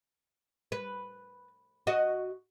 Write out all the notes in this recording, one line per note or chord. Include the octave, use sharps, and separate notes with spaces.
B4
F#4 D#5